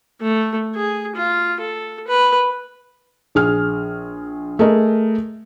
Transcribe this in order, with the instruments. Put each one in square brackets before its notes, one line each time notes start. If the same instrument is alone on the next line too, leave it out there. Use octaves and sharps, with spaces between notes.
[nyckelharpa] A3
G#4
F4
A4
B4
[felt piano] A#1 G#4 F6
A3 G#4 A#4 D#5